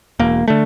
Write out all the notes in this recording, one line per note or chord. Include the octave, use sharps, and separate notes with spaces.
E1 A#3
D3 A3